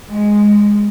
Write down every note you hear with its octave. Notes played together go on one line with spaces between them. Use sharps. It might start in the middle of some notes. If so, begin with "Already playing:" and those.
G#3